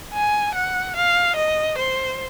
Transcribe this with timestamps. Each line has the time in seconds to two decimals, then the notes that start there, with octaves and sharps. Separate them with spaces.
0.13 G#5
0.55 F#5
0.96 F5
1.36 D#5
1.78 C5